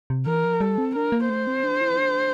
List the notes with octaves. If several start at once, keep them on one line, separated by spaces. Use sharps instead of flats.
C3
E3 A#4
F3
G3 A4
C4
D4 A#4
A#3
A3 C5
C4
D4
E4
D4